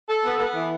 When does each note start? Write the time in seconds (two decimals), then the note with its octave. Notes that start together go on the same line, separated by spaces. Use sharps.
0.09 A4
0.25 B3
0.39 B3
0.56 E3